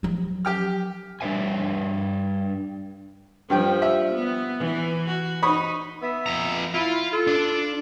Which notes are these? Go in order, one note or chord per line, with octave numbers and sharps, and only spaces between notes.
F3 F#3
G4 G5 F6
G3 D4 D#4 E5 G#5
G2 F3 G3 G4 G5
E5
B3
E3
F#4
D#4 B5 C#6 D#6
B3 E5
F2 A#5
E4 F4
F4 A4
D4